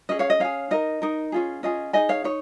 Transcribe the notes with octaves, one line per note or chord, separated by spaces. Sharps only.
C#4 G#4 D#5
C#5 F5
D#5
C#4 G#4 C#5 F5
D#4 A#4 D#5
D#4 A#4
C#4 F4 G#4
C#4 F4 G#4 D#5
D#4 G#4 D#5 G#5
C#5 F5
D#4 C#5